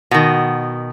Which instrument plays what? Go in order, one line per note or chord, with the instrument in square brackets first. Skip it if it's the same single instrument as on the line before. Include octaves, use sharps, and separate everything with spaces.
[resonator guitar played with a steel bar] B2 D#3